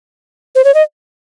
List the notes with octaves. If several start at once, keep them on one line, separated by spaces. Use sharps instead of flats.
C5
C#5
D#5